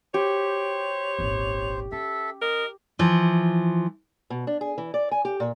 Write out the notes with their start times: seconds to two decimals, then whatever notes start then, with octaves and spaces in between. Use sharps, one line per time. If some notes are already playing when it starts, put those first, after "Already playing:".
0.14 G4 C5 C#5
1.19 D#1 G#1
1.92 C#4 A4 E5
2.42 A#4 D#5
2.99 E3 F3
4.30 B2
4.47 D4
4.61 G#4
4.78 E3
4.94 D5
5.11 G#5
5.25 G4
5.40 A#2